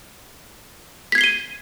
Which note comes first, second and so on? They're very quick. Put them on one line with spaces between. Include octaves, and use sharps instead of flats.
B6 G#6 C7 G7 D#7